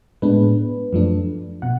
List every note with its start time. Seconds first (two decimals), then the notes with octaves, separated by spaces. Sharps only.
0.22 A2 G#3 B3 D4 B4
0.93 F#2 F3 A3 D4
1.62 B2 F#5